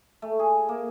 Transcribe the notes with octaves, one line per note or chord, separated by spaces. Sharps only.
A3
G#4
A#3